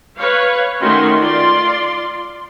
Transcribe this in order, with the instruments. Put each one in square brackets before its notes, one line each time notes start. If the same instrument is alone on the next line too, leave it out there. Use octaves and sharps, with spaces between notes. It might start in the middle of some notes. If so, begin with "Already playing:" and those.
[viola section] B4 C#5 F5
D#3 A3 C#4 F#4 C6
F4 D5 C6